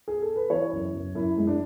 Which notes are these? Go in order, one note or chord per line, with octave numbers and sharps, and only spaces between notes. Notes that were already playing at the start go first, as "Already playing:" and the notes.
G#4
A4
B4
E3 C#5
F#2
F#2
F#2 E4
G#3
D4